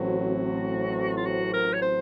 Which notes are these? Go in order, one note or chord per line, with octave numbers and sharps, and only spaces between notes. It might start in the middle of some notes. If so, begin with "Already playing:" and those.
Already playing: A1 A2 F#3 C4 F#4
F4
F#4
A#4
C#5
C5